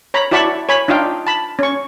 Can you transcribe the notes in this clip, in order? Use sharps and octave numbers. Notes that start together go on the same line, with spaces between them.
C#5 A#5 B5
E4 F#4 D5 A5 B5 C#6
C#5 G#5 B5
D4 D#4 F4 F5 G5
A5 B5
C#4 C#6